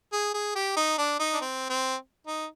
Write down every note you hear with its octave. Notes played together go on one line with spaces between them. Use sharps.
G#4
G#4
G4
D#4
D4
D#4
D4
C4
C4
D#4